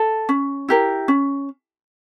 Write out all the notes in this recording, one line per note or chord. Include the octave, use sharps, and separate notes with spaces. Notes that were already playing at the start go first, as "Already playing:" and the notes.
Already playing: A4
C#4
E4 G4 A#4
C#4